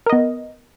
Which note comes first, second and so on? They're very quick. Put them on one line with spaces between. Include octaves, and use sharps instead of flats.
A#4 D#5 B3